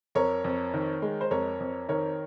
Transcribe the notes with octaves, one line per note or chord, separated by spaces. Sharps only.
F2 A#4 C#5
F2
D#3
G#3
C5
F2 A#4 C#5
F2
D#3 A#4 C#5